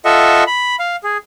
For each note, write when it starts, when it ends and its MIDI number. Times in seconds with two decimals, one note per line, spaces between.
0.05 0.44 65
0.05 0.44 69
0.05 0.44 75
0.05 0.44 76
0.05 0.44 78
0.47 0.76 83
0.79 0.96 77
1.04 1.17 68